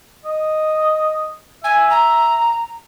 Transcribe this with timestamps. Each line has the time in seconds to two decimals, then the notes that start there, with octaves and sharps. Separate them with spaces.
0.25 D#5
1.64 E5 G#5
1.90 A#5